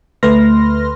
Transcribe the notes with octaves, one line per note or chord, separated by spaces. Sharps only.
D2 A3 B4 C6 F6 A#6